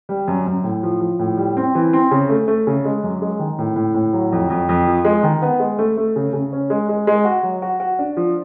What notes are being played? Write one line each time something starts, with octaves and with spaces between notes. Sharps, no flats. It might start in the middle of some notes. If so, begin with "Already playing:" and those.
G3
F#2
F#2
A2
F3
F3
A2
G3
C4
E3
C4
C#3
A3
A3
C#3
G#3
F#2
G#3
D#3
A2
A2
A2
F#3
F2
F2
F2
F3
G#3
D#3
B3
G#3
A3
A3
C#3
C#3
C#4
G#3
G#3
G#3
F#4
F#3
F#4
F#4
D4
F3